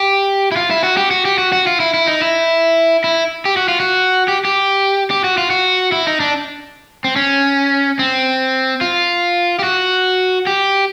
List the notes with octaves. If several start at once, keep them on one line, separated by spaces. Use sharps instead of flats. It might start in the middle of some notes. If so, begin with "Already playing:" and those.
Already playing: G4
E4
F4
E4
F#4
G4
F#4
G4
F#4
F#4
F4
E4
E4
D#4
E4
E4
G4
F#4
F4
F#4
G4
G4
G4
F#4
F4
F#4
E4
D#4
D4
C4
C#4
C4
F4
G4
F#4
G4